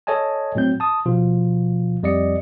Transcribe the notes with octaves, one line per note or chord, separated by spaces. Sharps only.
A4 C#5 D#5 G#5 A5
A2 F#3 C4 G6
A5 D#6
B2 F3 F4
F2 G3 D5 D#5 C#7